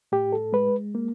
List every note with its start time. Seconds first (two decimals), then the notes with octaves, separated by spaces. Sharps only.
0.12 A2 G4
0.33 A4
0.53 G#3 B4
0.95 A#3